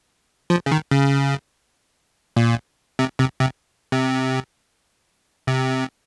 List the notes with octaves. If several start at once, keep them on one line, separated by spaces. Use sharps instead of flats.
F3
C#3
D#3
C#3
A#2
C3
C3
C3
C3
C3